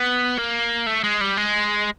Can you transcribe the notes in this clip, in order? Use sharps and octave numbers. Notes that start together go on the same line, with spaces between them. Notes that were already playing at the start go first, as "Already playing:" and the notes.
Already playing: B3
A#3
A3
G#3
G3
G#3